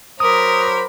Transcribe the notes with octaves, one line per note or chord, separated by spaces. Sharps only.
F#3 A#4 C5 B5 D6 D#6